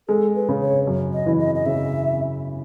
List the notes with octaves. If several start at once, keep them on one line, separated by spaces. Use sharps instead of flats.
G#3 A4
B4
C#3
C#5
F#2
D#5
E3
D#5
D#5
C#3 E5